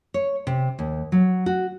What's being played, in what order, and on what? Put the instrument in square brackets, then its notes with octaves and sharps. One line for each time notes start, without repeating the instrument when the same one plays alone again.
[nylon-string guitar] C#5
C3
D#2
F#3
F#4